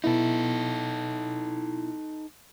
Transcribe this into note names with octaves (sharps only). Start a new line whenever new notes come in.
B2 B3 D#4 E4 A4